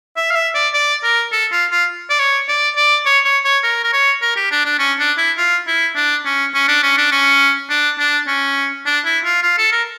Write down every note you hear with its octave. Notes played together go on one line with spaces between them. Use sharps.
E5
F5
E5
D5
D5
A#4
A4
F4
F4
D5
C#5
D5
D5
C#5
C#5
C#5
A#4
A#4
C#5
A#4
G4
D4
D4
C#4
D4
E4
F4
E4
D4
C#4
C#4
D4
C#4
D4
C#4
D4
D4
C#4
D4
E4
F4
F4
A4
A#4